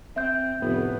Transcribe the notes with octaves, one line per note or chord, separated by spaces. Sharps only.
C4 E5 G6
F1 A2 B3